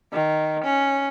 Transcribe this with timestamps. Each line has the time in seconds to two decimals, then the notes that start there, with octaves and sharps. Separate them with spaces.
0.13 D#3
0.64 C#4